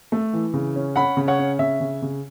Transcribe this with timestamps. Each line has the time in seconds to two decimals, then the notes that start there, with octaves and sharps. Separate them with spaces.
0.12 A3
0.33 E3
0.53 C#3
0.76 C#4
0.96 C#4 F#5 B5
1.17 C#3
1.27 C#5 F#5
1.39 C#4
1.59 C#3 E5
1.80 C#3
2.02 C#3